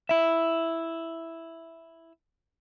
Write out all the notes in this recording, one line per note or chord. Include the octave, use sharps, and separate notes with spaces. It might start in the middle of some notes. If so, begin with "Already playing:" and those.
E4 E5